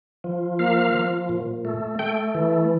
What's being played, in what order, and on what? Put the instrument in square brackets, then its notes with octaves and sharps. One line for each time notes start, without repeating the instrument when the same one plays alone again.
[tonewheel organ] F3
A#3 F5
F3
A#2
A3
A3 G5
E3